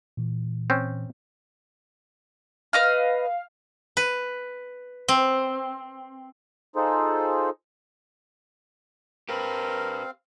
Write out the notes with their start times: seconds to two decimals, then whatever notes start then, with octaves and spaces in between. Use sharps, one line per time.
0.17 A#2 E3
0.70 C4 C#4
2.73 B4 D#5 F5 F6
3.97 B4
5.08 C4
6.76 D#4 F4 G#4 A4 C5
9.29 C4 G4 A#4 B4 F5